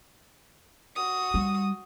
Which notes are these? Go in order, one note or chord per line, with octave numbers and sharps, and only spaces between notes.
F#4 D#6
G3